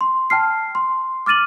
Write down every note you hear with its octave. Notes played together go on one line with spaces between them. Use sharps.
C6
G5 A5 F6 C7
C6
D6 F6 A6 D#7 F#7